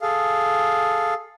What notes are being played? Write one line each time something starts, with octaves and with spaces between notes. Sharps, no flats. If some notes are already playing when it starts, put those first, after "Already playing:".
G#4 A4 F5